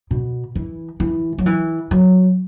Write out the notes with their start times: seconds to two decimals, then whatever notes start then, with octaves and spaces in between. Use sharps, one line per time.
0.11 B2
0.55 E3
1.00 E3
1.38 F#3
1.46 E3
1.91 F#3